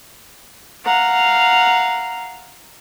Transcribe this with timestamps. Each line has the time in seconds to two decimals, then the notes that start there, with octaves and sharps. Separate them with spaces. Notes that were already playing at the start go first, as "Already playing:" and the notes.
0.84 F5 F#5 A#5